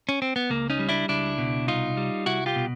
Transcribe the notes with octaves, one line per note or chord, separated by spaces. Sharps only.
C#4
C4
B3
C#2 A#3
C#4 D#4
G3
D4 E4
C#2 D4 E4
B2
C2 D#4 F4
G3
C2 E4 F#4
F4 G4
B2